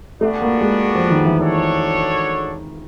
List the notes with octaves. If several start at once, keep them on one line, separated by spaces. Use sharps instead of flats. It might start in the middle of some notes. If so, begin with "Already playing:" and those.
G3 A3 B3 D4 F#4
A#3
G#3
F3
D#3
E3
D4 F#4 A4 C#5